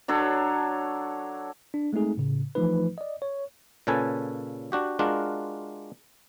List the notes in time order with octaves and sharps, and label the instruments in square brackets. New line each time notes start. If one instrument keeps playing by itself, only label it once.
[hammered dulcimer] F#3 D4 A4 C#5
[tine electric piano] D4
G#3 A3 C4 D#4 G#4
A2 C#3
E3 F3 A3 D#4 B4
D5 D#5
C#5
[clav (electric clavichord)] A#2 C#3 C#4 A4 B4 G#5
D4 F#4 G4
G#3 D4 F4 F#4 A#4